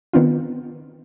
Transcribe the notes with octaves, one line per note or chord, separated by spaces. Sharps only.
D#3 B3 C4 D4 F4